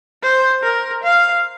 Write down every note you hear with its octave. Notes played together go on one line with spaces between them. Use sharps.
C5
A#4
F5